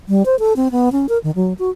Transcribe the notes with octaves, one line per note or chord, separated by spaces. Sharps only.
G3
C5
A4
C4
B3
C#4
A#4
D#3
F#3
F#4